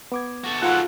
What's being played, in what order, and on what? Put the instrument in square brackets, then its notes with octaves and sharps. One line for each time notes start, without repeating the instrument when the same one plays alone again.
[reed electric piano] B3 D6 G#6
[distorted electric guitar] F#4 A4
[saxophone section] G#2 B2 F#5 [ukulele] F4